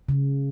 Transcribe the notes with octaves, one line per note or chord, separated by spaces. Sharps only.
C#3